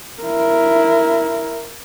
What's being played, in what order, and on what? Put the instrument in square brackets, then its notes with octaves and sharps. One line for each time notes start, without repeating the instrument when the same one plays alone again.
[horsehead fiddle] E4 A#4